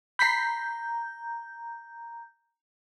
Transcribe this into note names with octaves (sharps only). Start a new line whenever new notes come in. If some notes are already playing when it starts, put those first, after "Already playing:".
A#5 B5 G6 B6 C7